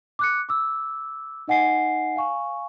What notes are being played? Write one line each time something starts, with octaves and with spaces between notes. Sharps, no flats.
D6 F#6 C#7
D6 E6
D#4 D#5 F#5 G#5 C7
F5 G#5 C#6